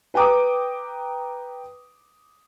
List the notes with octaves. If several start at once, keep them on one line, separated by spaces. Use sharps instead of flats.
B4 G5 A#5 D6 D#6